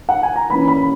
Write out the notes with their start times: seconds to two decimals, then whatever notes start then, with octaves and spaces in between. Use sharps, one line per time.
0.09 F#5
0.23 G#5
0.36 A#5
0.49 E3 A#3 C#4 B5
0.68 B5